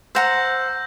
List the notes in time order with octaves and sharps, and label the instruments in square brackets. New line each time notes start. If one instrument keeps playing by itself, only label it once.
[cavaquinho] C5 F#5 A#5 [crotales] E6 G6 A#6